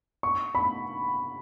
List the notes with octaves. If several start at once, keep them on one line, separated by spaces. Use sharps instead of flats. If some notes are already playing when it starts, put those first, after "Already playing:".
C#6
B5